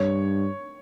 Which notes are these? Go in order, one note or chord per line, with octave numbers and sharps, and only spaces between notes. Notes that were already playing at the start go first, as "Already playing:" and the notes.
Already playing: G2 C#5